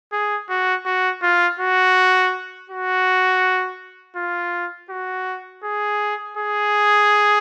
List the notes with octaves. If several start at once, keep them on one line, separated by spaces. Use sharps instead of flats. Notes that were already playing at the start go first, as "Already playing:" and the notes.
G#4
F#4
F#4
F4
F#4
F#4
F4
F#4
G#4
G#4